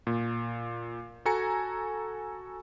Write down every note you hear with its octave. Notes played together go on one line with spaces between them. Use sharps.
A#2
F#4 A4 G#5 A#5 C#7